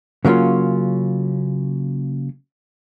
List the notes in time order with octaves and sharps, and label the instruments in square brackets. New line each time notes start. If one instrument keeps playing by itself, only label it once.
[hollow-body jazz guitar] C#3 F#3 A#3 C#4 F4